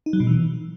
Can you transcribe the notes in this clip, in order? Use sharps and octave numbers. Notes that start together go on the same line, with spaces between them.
D#4
F#3
B2
E3